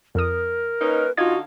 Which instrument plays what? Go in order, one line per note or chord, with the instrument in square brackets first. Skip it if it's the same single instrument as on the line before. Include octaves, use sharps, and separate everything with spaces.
[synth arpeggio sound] F2 D#6 [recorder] A#4
[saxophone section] A#3 C#4 D#4 [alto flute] B4
[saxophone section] D3 D#4 F5 [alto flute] F4 [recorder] F#4 [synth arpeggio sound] G#6